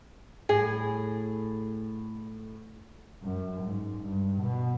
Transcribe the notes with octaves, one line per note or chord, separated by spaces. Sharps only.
A2 G#4
F#2
G#2
G2
B2